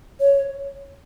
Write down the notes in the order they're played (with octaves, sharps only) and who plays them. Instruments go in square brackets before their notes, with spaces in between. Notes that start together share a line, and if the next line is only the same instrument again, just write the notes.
[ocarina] C#5